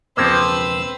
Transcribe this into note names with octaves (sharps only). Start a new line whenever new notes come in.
E1 C#2 B2 F3 A#3 C4 B4 E6